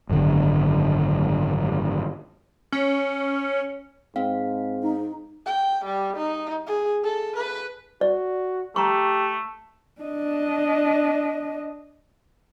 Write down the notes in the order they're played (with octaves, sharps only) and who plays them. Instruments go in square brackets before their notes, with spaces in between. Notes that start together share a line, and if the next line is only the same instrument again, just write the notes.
[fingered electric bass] G#1 F#2 A2 D3
[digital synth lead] C#4
[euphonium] G#2 [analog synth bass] C4 [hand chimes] F5
[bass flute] D#4
[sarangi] G5
G3
D#4
G#4
A4
B4
[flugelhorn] F#4 [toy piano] D5
[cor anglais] A3 [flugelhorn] G4 [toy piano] A#5 C#6
[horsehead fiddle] D4 D#5